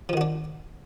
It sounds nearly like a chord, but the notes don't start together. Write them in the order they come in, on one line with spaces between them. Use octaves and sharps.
F3 D#3 F#4 D4